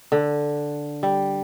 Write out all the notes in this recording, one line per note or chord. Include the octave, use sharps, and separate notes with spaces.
D3
G3